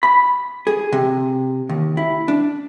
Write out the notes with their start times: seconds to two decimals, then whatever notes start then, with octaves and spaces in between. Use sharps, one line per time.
0.03 B5
0.67 G#4
0.92 C3
1.69 D#2
1.97 E4
2.28 D4